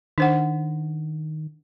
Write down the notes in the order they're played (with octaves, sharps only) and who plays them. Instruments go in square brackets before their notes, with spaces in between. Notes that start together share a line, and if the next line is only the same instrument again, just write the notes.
[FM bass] D#3 [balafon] D4 C5 F#5